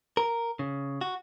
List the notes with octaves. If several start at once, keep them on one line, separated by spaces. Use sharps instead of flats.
A#4
C#3
F#4